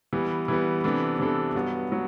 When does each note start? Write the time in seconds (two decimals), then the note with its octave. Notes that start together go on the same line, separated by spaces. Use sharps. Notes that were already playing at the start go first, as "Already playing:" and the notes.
0.13 E3 G3 B3
0.48 E3 G3 B3
0.84 C3 E3 B3 D4 A4
1.19 C3 E3 B3 D4 A4
1.55 G2 F#3 B3
1.92 F#3